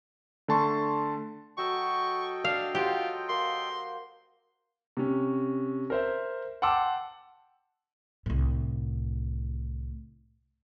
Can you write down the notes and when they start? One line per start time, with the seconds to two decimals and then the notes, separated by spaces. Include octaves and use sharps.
0.48 D3 A3 A5 C6 C#6
1.58 F#3 A4 D#5 G5 C#6 E6
2.45 D4 F5
2.75 F4 G4 C5 F#5
3.29 A#3 C6
4.97 C3 C#4
5.90 A#4 C5 E5
6.62 F#5 G5 A5 C6 D6 E6
8.26 C2 A2